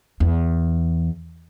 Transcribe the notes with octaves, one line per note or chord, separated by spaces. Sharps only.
E2